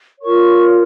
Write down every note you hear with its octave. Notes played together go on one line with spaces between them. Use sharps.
F4 A#4 C#5 C#6